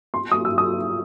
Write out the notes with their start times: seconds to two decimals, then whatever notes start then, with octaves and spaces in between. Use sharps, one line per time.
0.14 C6
0.31 D#6
0.45 E6
0.58 D#6